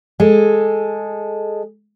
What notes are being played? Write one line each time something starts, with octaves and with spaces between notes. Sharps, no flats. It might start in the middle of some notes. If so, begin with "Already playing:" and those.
G#3 A4